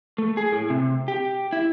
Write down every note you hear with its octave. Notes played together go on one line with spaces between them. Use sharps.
A3
G#4
A2
C3
G4
E4